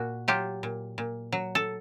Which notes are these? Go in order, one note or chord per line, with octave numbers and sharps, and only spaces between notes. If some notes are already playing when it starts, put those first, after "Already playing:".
Already playing: A#2 F#4
F#3 F4 G4
A#2
A#2
F#3
A4